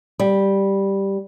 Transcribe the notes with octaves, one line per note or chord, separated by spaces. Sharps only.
G3